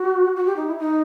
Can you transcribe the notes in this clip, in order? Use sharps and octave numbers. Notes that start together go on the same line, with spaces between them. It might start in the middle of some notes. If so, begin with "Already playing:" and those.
Already playing: F#4
F#4
G4
D#4
E4
D#4